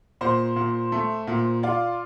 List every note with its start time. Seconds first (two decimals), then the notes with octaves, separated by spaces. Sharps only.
0.21 A#2 C5
0.56 A#2
0.92 A3
1.27 A#2
1.63 F4 D5